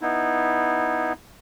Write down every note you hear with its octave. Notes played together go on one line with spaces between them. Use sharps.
B3 D#4 E4